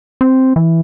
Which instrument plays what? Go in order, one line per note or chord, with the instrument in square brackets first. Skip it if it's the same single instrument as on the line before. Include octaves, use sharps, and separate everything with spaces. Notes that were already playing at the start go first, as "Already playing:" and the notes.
[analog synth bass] C4
E3